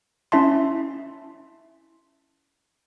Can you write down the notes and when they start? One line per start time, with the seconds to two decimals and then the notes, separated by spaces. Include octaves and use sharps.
0.32 C#4 E4 E5 A5 C6